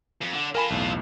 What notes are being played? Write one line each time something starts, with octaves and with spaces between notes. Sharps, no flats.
F2
D3
F4 A4 A#4 G#5 B5
B1 E2 A2